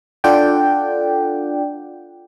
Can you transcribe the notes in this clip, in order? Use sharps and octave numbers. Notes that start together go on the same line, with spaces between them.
D4 F4 A4 D5 F#5 G5